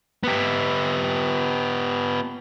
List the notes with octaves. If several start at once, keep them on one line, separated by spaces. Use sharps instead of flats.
B3 G4